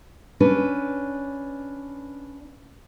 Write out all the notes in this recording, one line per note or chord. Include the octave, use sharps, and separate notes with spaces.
C#4 D4 B4